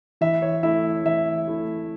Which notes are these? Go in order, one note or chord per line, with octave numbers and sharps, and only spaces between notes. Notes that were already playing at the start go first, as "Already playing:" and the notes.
E3 E5
C#5
A3 E4 E5
E3 E5
A3 E4